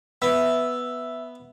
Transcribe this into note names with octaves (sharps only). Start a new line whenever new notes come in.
B3 E5